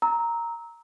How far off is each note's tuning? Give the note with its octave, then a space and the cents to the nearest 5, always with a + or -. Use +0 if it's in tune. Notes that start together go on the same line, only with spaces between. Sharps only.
A#5 +0 E6 -30